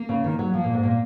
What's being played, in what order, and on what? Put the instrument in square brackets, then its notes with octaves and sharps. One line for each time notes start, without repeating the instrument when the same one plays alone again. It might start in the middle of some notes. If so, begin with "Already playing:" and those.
Already playing: [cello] A#3
[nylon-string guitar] C#3
D#3
F#3
[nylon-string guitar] F3 [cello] A#3
[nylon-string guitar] A#2
G#2
A#2